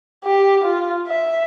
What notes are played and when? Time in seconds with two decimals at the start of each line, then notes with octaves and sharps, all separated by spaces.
0.25 G4
0.64 F4
1.08 E5